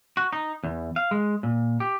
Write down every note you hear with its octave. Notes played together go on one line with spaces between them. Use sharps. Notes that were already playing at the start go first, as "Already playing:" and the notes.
F#4
D#4
E2
F5
G#3
A#2
G4